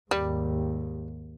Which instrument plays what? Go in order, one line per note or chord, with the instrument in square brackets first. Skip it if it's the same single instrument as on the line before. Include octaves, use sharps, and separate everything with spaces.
[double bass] D#2 G#2 [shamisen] G3